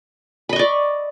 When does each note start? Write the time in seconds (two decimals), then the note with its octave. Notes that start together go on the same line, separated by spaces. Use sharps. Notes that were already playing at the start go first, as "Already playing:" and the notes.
0.49 B5
0.53 D#5
0.56 C#6
0.59 D5